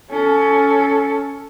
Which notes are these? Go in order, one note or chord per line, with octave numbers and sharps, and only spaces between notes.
C#4 A4